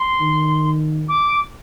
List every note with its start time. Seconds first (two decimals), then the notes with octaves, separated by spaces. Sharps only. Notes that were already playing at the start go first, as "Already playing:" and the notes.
Already playing: C6
0.20 D#3
1.09 D6